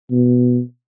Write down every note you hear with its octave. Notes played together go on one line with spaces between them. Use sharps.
B2